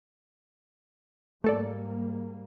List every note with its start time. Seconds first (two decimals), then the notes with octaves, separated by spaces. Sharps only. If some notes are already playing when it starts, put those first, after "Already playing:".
1.44 G#2 G3 A3 A#3 A4 D5